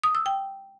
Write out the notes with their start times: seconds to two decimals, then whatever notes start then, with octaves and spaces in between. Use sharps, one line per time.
0.04 D#6
0.15 E6
0.26 G5